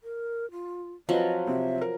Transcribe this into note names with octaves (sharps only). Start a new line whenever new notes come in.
A#4
F4
F3 F#3 C4 B4 D#5
C3 C4 E5
A#4